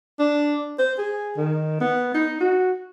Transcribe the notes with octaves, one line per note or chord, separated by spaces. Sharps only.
D4
C5
G#4
D#3
B3
D#4
F#4